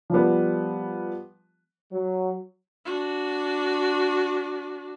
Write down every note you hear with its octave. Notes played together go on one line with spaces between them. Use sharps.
F3 G3 B3
F#3
D4 F#4